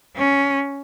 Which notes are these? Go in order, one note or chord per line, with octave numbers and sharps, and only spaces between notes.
C#4